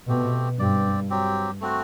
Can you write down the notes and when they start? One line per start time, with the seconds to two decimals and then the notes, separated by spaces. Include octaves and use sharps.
0.08 B2 A3 C4 G4
0.59 G2 C4 G4 D5
1.10 F#3 C4 G4
1.61 A3 C4 F#4